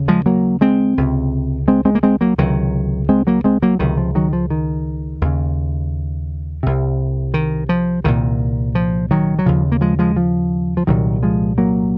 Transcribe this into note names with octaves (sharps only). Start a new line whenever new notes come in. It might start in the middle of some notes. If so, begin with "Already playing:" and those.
Already playing: D#2 C#3
F3 G#3
F#3 A#3
G#3 C4
C#2 C3
G#3 C4
G#3 C4
A#3
G#3 C4
F#3 A#3
C#2 C3 D#3 F#3
G#3 C4
F#3 A#3
G#3 C4
F#3 A#3
C#2 C3 D#3 F#3
F3
D#3 F#3
F3
D#3
D#2 C#3
C2 C3
D#3
F3
C2 A#2 D#3
F3
D#3 F#3
F#3
D#2 C#3 F3
A#3
F3 G#3
F3 G#3
F3
F3
C2 A#2 D#3 F#3
F3 G#3
F#3 A#3